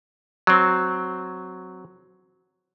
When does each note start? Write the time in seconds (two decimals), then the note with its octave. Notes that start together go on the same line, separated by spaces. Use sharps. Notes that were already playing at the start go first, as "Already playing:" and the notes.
0.47 F#3 C4